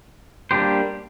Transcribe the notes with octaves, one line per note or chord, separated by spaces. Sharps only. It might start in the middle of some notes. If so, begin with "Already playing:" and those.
G3 A#3 D4 G4 C5